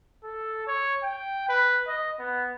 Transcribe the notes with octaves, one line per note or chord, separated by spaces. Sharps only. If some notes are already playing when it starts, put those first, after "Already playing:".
A4
C#5
G5
B4
D#5
B3